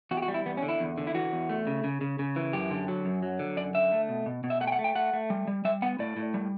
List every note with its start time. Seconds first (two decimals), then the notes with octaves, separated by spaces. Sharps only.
0.11 E2 F#4
0.17 G4
0.22 F#4
0.28 G3
0.34 E4
0.46 E2 B3
0.57 C#4
0.63 D3
0.69 E4
0.80 E2
0.98 D3
1.07 E4
1.15 E3 F#4
1.32 E2
1.49 A3
1.67 C#3
1.84 C#3
2.01 C#3
2.19 C#3
2.36 E3
2.53 F#2 G4
2.71 D3
2.88 F#3
3.05 F#2
3.23 F#3
3.39 D3
3.57 F#2 D5
3.74 D3 E5
3.92 A3
4.09 B2
4.26 B2
4.44 B2
4.50 E5
4.61 A3 F#5
4.67 G5
4.72 F#5
4.79 A3
4.84 G5
4.95 A3 F#5
5.13 A3
5.30 G3
5.47 G3
5.65 G3 E5
5.82 B3 F#5
5.99 A2 D5
6.17 A2
6.34 G3